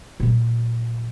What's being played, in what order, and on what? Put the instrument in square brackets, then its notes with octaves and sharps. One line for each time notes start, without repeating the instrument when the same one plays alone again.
[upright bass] A#2 F#3